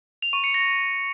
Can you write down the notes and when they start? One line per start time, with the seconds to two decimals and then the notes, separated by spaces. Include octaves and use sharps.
0.22 F7
0.33 C#6
0.44 C#7
0.54 A#6